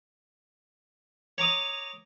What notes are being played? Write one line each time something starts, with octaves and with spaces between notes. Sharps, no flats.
C#5 A#5 D6 D#6